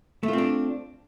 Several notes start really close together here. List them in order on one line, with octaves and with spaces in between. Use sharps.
A3 F4 C4 D4